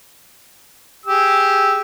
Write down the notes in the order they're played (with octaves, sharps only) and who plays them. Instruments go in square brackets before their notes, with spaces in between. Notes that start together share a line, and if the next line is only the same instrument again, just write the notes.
[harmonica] G4 G#4 E6